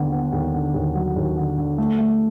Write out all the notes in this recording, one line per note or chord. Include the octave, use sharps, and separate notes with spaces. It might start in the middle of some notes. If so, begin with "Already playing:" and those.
Already playing: D#2 D3 B3
B3
D#2
D3
D#2
F#3
D#2
D3
D3
A3
A3